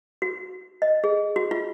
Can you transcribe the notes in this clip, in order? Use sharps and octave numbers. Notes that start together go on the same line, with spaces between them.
F#4
D#5
G#4
F#4
F4